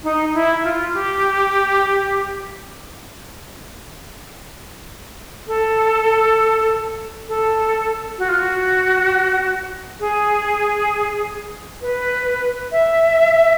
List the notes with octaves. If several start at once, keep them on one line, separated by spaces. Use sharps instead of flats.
D#4
E4
F4
G4
A4
A4
F#4
F4
F#4
G#4
B4
E5